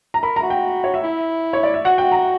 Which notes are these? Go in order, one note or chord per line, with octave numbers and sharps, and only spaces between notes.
A#5
A#4 B5
A#5
F#4
G5
C#5
E5
E4
C#5
D5
E5
F#4 F#5
G5
A#5